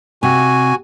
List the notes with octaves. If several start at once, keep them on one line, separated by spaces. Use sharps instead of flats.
C3 F#4 G#5